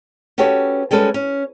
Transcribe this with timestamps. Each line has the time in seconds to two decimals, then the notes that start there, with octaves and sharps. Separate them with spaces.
0.38 C#4 F#4 G4 A4 B4 C#5
0.91 G3 G#3 C#4 A4 B4
1.14 C#4